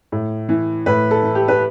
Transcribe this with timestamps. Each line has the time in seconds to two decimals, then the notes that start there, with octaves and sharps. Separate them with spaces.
0.12 A2
0.49 E3
0.86 A2 B4
1.11 A4
1.23 E3
1.35 G4
1.48 B4